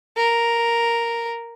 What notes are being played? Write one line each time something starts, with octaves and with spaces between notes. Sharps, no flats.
A#4